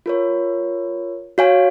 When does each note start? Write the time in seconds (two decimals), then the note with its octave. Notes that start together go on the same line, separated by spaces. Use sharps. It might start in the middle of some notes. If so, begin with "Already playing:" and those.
0.06 F4 A#4 C#5
1.38 F#4 C#5 F5 G#5